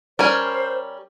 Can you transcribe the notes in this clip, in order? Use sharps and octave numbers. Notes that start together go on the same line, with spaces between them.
G3 C#4 A#4 C5 G#5